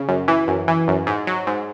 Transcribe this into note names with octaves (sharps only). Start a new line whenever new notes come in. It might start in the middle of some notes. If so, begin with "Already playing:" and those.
Already playing: C#3
F#2
E3
F#2
E3
F#2
G#2
F#3
G#2